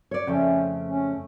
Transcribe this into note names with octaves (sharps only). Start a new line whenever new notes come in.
C#5 D5
F2 C#3 A3 C#4 G5
C#4